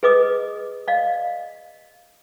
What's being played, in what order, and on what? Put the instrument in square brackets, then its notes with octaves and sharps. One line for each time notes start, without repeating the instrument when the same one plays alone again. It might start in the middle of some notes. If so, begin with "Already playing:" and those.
[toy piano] G#4 B4 D#5 D6 D#6
D5 D#5 F5